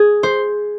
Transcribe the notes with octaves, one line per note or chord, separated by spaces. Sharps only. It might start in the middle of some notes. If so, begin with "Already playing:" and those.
Already playing: G#4
C5